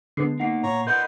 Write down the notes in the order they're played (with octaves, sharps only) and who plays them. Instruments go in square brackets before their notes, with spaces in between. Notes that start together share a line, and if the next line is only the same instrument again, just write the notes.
[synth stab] D3 G#3 B3 [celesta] C7
[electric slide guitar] A#3 D#4 [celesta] F#5 C7
[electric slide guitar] A#2 [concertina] C#5 A#5
[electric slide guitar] A#4 D#5 F#5 [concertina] B4 C6 [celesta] G6